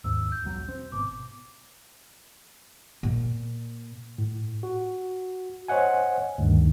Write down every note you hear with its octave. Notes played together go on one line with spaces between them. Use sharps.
D#2 G#2 E6
G6
E1 B1 F#3
C4
G#1 B2 D6
A#2
A2
F#4
C5 C#5 D#5 F#5 G#5
D2 G2 D#3